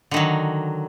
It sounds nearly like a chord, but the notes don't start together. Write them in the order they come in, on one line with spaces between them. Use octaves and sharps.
D3 D#3 F#3